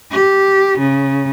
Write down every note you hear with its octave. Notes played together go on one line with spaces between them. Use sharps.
G4
C#3